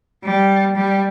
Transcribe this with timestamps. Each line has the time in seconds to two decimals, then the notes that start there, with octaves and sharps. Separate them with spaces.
0.24 G3
0.76 G3